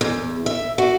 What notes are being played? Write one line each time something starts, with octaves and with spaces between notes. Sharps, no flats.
E2
E5
F#4